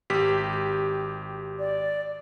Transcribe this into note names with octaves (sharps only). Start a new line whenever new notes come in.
G#1 G4 B6
D5